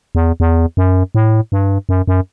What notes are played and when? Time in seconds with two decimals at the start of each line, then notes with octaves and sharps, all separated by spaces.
0.15 E2
0.40 E2
0.77 F#2
1.15 A2
1.52 G2
1.89 F#2
2.08 F#2